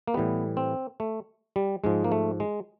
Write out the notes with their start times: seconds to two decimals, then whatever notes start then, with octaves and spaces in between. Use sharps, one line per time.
0.07 A#3
0.14 A2 E3 G3 B3
0.57 C4
1.00 A3
1.56 G3
1.84 G#2 F3 G#3
2.04 A#3
2.12 A3
2.40 G#3